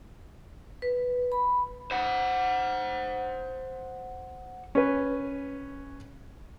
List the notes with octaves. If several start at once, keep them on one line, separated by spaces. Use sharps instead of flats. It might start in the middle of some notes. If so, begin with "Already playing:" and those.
B4
B5
C5 F#5
C#4 B4